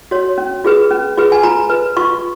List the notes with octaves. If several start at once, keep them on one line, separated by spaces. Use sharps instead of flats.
F#4 C#5
C#4
F4 G#4 B4
C#4
F4 G#4 B4
G#5
F4 A#5
B4
F4 C#6